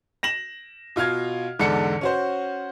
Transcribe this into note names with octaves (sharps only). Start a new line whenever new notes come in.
A#6 E7 F#7
B2 F4 F5 F6 G#6
E2 G#2 D3 A4 D5 C#7
C#4 F#4 C5